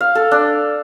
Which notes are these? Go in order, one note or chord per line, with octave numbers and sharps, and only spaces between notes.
F5
A4
D4